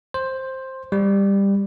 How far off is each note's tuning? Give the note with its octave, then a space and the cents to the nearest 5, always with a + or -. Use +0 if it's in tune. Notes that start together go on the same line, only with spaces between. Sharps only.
C5 +10
G3 +15